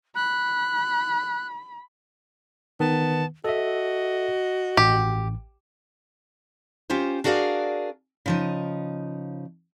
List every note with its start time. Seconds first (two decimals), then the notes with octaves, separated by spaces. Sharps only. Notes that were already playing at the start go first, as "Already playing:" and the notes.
0.15 B5 F#6
2.80 D#3 B3 A5
3.44 F#4 A4 D#5 E5
4.77 A1 G4
6.90 C#4 F4 G4 C5
7.24 D4 F#4 G#4 A#4 D5 F5
8.26 C#3 F3 D#4